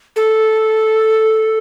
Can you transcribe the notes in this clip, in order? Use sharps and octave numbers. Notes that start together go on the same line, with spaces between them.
A4